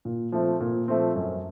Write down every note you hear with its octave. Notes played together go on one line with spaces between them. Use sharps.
A#2
F3 A3 C4
A#2
F3 A3 C4
F#2